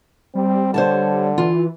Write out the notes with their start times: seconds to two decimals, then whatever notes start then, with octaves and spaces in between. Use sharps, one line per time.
0.35 G3 C4
0.74 D3 C5 C#5 A5
1.38 E3 F4